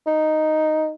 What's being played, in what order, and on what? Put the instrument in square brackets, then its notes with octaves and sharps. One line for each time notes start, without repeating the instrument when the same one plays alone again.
[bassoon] D#4